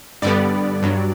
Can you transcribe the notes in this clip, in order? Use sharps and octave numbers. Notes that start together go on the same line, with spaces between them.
G2 D3 G3 B3 D5
G2 F#3